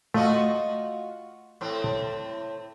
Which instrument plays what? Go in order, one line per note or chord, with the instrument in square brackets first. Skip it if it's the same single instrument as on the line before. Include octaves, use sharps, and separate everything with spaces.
[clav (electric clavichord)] A3 [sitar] F4 F#4 D#5
[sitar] A2 C4